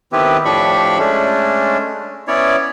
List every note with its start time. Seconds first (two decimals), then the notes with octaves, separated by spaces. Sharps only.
0.12 D#3 B3 C4 E4 G4 B4
0.45 A2 F3 D4 G4 B5 C#6
0.99 G#3 A3 C#4 D4
2.28 B3 C#4 E4 C#5 D5